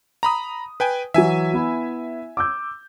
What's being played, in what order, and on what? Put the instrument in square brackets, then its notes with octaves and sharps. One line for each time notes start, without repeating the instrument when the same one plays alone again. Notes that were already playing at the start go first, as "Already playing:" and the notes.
[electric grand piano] A#5 B5 D#6
B4 G5 G#5
[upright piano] E3 F#3 [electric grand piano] E5 G#5
[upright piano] B3 E4
D6 E6 G6